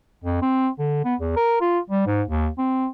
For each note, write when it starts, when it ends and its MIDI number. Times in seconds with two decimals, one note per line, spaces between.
0.24 0.40 41
0.42 0.68 60
0.78 1.00 50
1.05 1.15 59
1.20 1.33 40
1.36 1.61 70
1.61 1.79 65
1.90 2.05 55
2.07 2.22 44
2.28 2.48 39
2.58 2.88 60